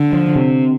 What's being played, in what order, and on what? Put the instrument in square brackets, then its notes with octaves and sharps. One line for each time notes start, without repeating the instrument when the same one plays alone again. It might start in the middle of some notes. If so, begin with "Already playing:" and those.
Already playing: [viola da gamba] D3
[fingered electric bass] F3
C3